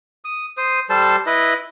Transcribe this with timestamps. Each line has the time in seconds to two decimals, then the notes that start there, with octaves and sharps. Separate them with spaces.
0.25 D#6
0.57 C5 D#6
0.90 G3 A4 C5 A5
1.26 E4 B4 D#5